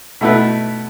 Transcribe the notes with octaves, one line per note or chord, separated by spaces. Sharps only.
B2 A3 E4 B4